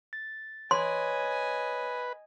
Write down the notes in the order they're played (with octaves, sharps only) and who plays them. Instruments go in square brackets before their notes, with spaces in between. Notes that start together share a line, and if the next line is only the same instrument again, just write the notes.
[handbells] A6
[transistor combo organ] B4 [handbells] C#5 [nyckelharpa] D#5 G#5 [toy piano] C6